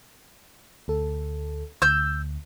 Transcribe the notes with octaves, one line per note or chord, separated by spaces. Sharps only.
D2 A4
D2 E6 G6